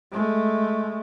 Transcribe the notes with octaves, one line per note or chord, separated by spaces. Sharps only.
G#3 A3